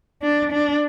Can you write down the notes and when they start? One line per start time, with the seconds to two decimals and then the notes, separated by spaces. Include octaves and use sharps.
0.22 D4
0.52 D4